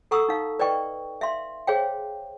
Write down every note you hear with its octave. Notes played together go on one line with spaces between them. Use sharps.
A4 F#5 A#5 C#6 D#6 E6
D#4 F5
B4 D5 D#5 G5 C#6
E5 F5 C6
G#4 C5 C#5 F5 G5